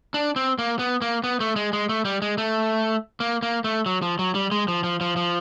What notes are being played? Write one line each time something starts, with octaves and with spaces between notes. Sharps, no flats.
D4
C4
A#3
B3
A#3
B3
A3
G#3
G#3
A3
G3
G#3
A3
A#3
A#3
A3
F#3
F3
F#3
G3
G#3
F3
F3
F3
F3